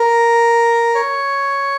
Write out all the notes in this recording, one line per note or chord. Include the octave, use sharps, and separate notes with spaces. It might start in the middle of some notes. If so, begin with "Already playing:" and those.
Already playing: A#4
C#5